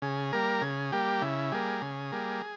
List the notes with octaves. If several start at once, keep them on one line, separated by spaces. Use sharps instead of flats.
C#3 G#4
G3 A#3 A#4
C#3 G#4
G3 A#3 G4
C#3 E4
G3 A#3 G#4
C#3
G3 A#3